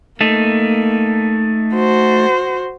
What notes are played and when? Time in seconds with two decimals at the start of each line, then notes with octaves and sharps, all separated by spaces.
0.21 A3 A#3 D#4
1.74 F#4 C5